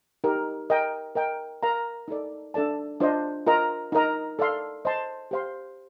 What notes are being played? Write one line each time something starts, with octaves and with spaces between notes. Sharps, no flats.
D#4 G4 A#4
A#4 D#5 G5
A#4 D#5 G5
A#4 F5 A#5
D#4 A4 D5
D4 A4 D5 A5
D4 F4 C5 D#5
F4 A#4 D#5 A#5
D#4 A#4 D#5 A#5
A4 D5 F5 C6
C5 D#5 A5 C6
G4 C5 F5 C6